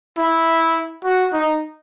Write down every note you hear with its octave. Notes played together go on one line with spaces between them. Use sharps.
E4
F#4
D#4